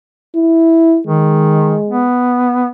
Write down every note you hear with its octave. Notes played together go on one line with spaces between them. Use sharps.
E4
D#3 G#3
B3